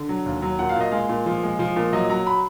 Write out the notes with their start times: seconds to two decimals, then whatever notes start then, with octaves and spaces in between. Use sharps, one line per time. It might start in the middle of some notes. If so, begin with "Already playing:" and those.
Already playing: D3
0.09 F#3
0.26 D#2
0.42 F#3
0.59 A#2 F#5
0.69 F5
0.76 A#2 D#5
0.91 G#3 F5
1.09 A#2
1.26 F3
1.43 G#3
1.59 F3
1.76 A#2
1.93 F#3 D#5
2.10 F#3 A#5
2.27 B5